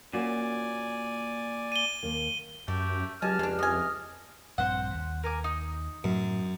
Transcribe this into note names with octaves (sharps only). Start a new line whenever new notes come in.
A#2 A#3 C#4 F#4 D5 G#5
D#7 G7
D#2 A#3
F#2 A3 G4
C#2 F#3 G4 D#5 G#5 A5 F6
F2 G#3 D4
E3 D#5 G#5
A#1 G2 C4 C5 F#5
D#2
A#4 G#5 D6
D#4
F#2 A2